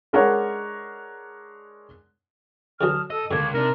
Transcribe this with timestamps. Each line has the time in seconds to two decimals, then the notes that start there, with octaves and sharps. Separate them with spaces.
0.13 G#3 D4 A#4 C#5 F#5
2.81 D3 E3 F#3 A5 D#6 F6
3.10 A4 D#5 E6
3.31 C#2 F#2 D3 A#3 A5 D6 G#6
3.54 C3 D4 D#4 A#4